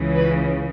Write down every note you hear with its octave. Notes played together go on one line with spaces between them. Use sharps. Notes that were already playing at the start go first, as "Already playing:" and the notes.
Already playing: C#2 C#3 E3
B4